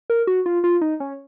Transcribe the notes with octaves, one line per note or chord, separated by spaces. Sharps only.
A#4
F#4
F4
F4
D#4
C#4